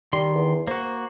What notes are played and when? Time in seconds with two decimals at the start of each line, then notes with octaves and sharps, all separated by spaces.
0.13 D#3 G3 C6
0.35 E2
0.67 A#3 F#4 C5